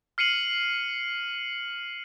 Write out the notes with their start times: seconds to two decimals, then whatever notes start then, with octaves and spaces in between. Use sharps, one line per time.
0.18 F6 C7 C#7 D#7 F#7